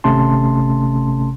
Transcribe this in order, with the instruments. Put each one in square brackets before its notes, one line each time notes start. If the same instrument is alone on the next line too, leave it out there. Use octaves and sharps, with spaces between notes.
[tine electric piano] G#1 C3 A3 C#4 A5 C6